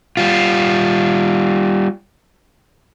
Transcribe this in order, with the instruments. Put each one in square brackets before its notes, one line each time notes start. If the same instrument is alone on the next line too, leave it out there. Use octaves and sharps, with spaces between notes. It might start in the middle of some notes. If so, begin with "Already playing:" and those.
[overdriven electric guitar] G3 F4